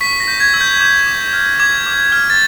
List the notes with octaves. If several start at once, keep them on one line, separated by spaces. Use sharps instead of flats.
C#6 B6
A#6
G6
G#6
E6
G6
D6 G6
D6
F6
D6 G#6
D6
F6
A6